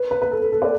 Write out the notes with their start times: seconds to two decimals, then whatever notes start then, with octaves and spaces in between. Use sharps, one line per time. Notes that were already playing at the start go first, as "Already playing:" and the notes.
Already playing: B4
0.11 B4
0.22 B4
0.31 A4
0.42 A4
0.52 A4
0.62 D5